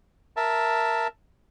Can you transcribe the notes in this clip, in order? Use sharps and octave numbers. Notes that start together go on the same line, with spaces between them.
A#4 E5 A5